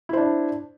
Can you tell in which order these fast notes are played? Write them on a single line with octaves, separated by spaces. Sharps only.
E4 C5 D4